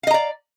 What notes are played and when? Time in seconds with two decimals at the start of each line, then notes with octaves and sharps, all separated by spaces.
0.03 F5
0.07 D#5
0.11 A#5
0.14 D5